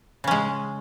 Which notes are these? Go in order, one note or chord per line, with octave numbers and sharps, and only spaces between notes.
C#3 G#3 C#4